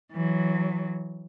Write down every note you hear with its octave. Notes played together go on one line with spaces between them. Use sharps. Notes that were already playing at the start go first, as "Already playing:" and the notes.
E3 F#3